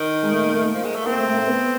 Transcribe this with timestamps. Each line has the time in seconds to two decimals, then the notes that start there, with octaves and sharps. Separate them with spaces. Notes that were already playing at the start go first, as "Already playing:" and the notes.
Already playing: D#3
0.23 G#3
0.32 A3
0.43 A#3
0.53 A3
0.64 A#3
0.75 F3
0.85 G#3
0.96 A3
1.06 A#3 C4
1.17 A3
1.27 A3
1.33 A#3
1.38 A3
1.48 B3